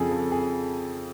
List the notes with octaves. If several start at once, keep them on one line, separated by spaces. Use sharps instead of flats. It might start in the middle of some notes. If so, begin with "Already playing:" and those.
Already playing: F2 C#3 F3 G#4 A4
A4
G#4